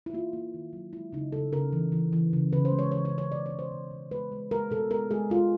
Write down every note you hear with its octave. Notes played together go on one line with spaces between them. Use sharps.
E4
A#3 F4
A#3
D#3
F#3
G#3 E4
C#3 D#4
C#3 A4
C#3 A#4
E3
E3
E3
C#3
C#3 B4
C5
G#3
C#5
E3 C#5
C#5
C#3
C#5
B2 D5
C#5
B2
C5
B2
B2
G#3 B4
G#3
G#3 A#4
B2 A4
G#3 A#4
G#3 G#4
G#3 F4